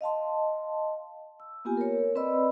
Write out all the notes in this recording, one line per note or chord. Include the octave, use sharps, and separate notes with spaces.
D#5 F5 A5 C6
E6
A#3 B3 F4 G4 G#5
A#4 C#5
C4 B4 D5 D#5 B5 E6